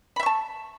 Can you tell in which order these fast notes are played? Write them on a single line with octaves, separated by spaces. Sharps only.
B5 E5 C#6 A5